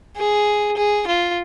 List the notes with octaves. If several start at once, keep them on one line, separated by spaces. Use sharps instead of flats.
G#4
G#4
F4